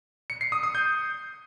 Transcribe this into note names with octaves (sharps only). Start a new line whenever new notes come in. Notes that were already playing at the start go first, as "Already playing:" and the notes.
C#7
C7
D#6
D#6
G6